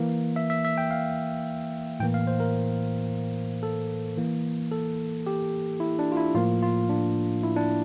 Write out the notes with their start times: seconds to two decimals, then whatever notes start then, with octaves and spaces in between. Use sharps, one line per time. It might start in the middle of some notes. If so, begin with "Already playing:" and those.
Already playing: E3 A#3
0.36 E5
0.50 E5
0.65 E5
0.78 G5
0.91 F5
2.00 A2 E3 A#3 G5
2.14 F5
2.27 C5
2.40 A#4
3.63 A4
4.18 E3 A#3
4.72 A4
5.27 G4
5.80 E4
5.99 D4
6.12 F4
6.17 E4
6.35 A2 F3 A#3 F4
6.62 F4
6.89 D4
7.44 E4
7.56 D4